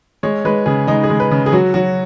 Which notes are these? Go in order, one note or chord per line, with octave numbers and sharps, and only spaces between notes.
G#3 C#5
G#3 B4
C#3 G#4
G#3 D#4
G#4
G#3
B4
C#3
G#4
F#3 F#4
F#3 F#4